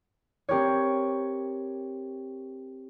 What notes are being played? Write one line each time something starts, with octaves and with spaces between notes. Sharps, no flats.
C4 G4 A#4 C#5